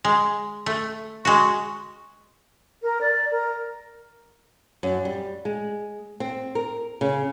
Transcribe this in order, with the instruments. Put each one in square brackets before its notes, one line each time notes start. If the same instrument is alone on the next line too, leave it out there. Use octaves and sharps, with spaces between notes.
[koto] G#3
A3
[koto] G#3 F#4 [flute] C#6
[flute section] A#4
D5
A#4
[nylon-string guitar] F#2
G3
G#3
C4
A#4
C#3